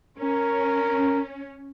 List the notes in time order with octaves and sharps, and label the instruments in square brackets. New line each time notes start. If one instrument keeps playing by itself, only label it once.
[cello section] C#4 [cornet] A#4